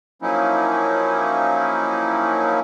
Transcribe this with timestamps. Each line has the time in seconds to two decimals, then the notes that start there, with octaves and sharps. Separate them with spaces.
0.22 F3 F#3 A#3 C#4 D#4 E4